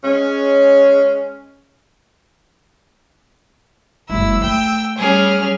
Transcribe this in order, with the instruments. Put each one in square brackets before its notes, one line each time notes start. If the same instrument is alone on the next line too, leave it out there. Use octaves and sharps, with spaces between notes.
[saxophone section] G#3 C#4
[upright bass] F#1 G#3 [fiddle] E4 [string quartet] E6
[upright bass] A3 [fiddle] G5
[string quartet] G3 C#4 F6 [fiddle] G#4